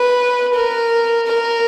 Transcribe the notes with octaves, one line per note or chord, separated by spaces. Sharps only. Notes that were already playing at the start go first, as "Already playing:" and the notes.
Already playing: B4
A#4
A#4